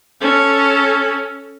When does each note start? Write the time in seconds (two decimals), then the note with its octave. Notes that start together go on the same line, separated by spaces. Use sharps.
0.21 C#4 A4